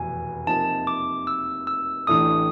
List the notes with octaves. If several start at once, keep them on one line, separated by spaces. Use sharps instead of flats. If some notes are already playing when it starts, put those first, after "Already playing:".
Already playing: F1 E2 B2 G#5
C3 F3 A#3 D#4 A5
D6
E6
E6
A1 A2 E3 A3 D4 D#6